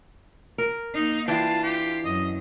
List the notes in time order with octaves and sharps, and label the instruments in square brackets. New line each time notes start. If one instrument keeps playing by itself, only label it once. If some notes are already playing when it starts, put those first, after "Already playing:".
[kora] A#4
[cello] A#3 D#4
[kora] E3 D4 G5 [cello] F4 [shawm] A5
[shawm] G4
[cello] F#2 [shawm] D#5